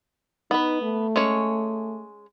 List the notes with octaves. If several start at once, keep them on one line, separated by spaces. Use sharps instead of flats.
B3 D#4 B4
A3
G#3 C#4 C#5